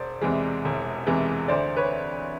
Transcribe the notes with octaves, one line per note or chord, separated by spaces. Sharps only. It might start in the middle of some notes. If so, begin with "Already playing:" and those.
Already playing: E1 C5 D5
E2 C3 E3 G#3
E1
E2 C3 E3 G#3
D2 C5 D5
B4 C#5